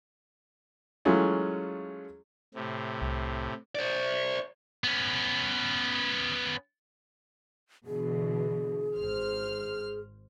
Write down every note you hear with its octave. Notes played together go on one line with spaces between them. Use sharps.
E3 F#3 G#3 A3 C#4 F4
A2 C3
C2
C5 D5
B3 C#4
B2 D3 E3 G#4
G#1 C5 F6